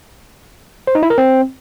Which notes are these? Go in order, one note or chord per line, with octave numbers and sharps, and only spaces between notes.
C5
D#4
E4
A#4
C4